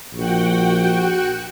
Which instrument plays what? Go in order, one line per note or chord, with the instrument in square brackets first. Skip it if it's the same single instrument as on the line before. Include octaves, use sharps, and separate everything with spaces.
[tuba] A#1 [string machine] F#4 F#5 G5